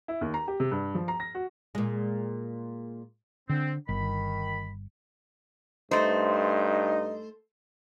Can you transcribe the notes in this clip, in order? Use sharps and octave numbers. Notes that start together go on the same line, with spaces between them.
E4
D#2
A#5
G4
C3
G2
F3
A#5
A#6
F#4
A#2 G#3
D3 C4
G1 D#3 B5
G2 A3 D#4 C5